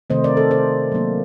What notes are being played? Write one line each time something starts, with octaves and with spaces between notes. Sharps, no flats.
C3 D#3 A3 C4 C5 D#5
A#4 D5
A4 C5
A4 C5
F#3 A#3 D4